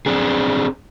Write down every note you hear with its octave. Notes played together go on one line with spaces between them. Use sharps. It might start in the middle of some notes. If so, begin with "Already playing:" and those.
C4 D4 G#4